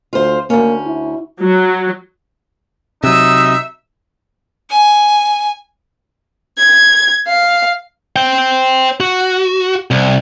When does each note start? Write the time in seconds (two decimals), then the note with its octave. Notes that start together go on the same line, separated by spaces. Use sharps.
0.13 D2 F4 C5
0.50 D2 A#3 C#4
0.86 E4
1.42 F#3
3.04 C3 F#3 D#4 E5
4.71 G#5
6.57 G#6
7.27 F5
8.16 C5 G5
9.00 F#4
9.91 C2